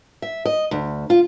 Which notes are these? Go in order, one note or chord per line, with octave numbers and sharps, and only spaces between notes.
E5
D#5
D2
F4